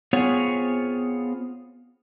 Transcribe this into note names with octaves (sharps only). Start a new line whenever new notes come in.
B3 C4 F4 G#4 C#5 F#5